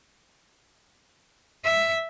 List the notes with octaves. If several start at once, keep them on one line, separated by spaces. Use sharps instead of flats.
E5